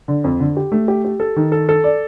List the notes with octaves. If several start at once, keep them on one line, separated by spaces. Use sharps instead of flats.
D3
F2
D3
G4
A3
G4
G4
A4
D#3
A4
A4
D5